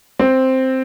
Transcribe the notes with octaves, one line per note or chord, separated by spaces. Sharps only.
C4